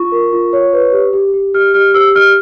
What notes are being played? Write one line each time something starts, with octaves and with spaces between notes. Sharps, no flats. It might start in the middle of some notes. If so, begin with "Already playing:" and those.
Already playing: F4 C#6
A#4
F4
C#5
B4
G4
G4
G4
G4 F6
G4 F6
G4 E6
G4 F6